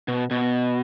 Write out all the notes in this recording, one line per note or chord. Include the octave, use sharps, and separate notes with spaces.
B2
B2